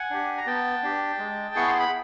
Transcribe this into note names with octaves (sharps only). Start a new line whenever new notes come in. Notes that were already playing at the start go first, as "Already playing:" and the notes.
Already playing: F#5 G#5
D4 G4
A#5
B3 G5 A5
D4 G4
G#3
B3 E4 G#4 C#6
C6
B5